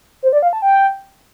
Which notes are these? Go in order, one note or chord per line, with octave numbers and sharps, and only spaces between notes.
C5
D5
F5
A5
G5